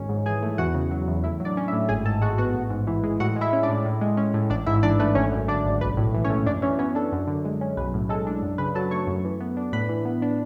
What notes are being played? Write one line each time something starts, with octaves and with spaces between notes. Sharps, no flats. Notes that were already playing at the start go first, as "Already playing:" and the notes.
Already playing: G#1 C#4
G#2
E3 G#4 G#5
A3
E2 F#4 F#5
C#3
F#3
E2
A2 E4 E5
F#3
D4 D5
C#4
E4 E5
A2
G#1 G#4 G#5
G#2 A4 A5
G#3 F#4 F#5
B3 F#4 F#5
A1
G#2
E3
G#3
A2 F#4 F#5
G#3
E4 E5
C#4
D4 D5
A2
A2
G#3
C#4
A2
A1 D4 D5
G#2 E4 E5
E3 D4 D5
A3 B4
G#1 C#4 C#5
F#2
D3 D4 D5
G#1
B1 B4
A2
E3
C#4 C#5
A3
F#2 D4 D5
E3 C#4 C#5
B3 C#4 C#5
D4 A4
F#2
D3
G#3
C#4
B1 B4
A2
G#3 A4
D4
F#2
C#3 B4
F#3 A4 A5
A3 C#5 C#6
F#2
E3
B3
D4
A2 B4 B5
E3
B3
D4